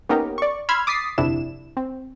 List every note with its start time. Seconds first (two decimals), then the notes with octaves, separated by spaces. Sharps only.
0.09 A#3 B3 C#4 D#4 G4 A#4
0.38 D5 C#6
0.69 B5 C6 E6 F6 G#6
0.87 D6 D#6 A6 B6 C7
1.18 G1 F2 C3 D4 E4 E7
1.77 C4